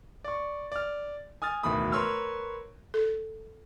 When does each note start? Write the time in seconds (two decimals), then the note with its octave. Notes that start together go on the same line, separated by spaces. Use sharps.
0.24 D5 C#6
0.72 D5 F6
1.42 G#5 D#6 F6 A6
1.63 D1 E2 B2 D#3 B5 D#6
1.92 A#4 B4 C#5 C6 E6 F6
2.94 A4